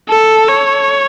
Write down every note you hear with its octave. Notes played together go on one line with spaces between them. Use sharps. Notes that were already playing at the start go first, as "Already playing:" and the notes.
A4
C#5